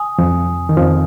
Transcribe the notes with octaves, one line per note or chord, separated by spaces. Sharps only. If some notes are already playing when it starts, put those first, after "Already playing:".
Already playing: G#5 D#6
F2 F3
D#3
F2 F3